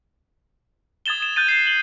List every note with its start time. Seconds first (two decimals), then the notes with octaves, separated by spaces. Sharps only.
1.06 D#6 G#6 A6 E7 G7
1.22 E7
1.36 F#6 G6 A6 D#7
1.48 C7
1.67 F#7 G7